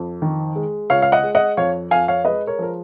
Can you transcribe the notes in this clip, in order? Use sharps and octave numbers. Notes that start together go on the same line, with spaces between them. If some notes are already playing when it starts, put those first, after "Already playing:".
Already playing: F2
D#3
G#3
C#2 C#5 F5
F5
D#5 F#5
G#3
D#5 F#5
F2 C#5 F5
F2 F5 G#5
C#5 F5
G#3 B4 D#5
A#4 C#5
F3 A#4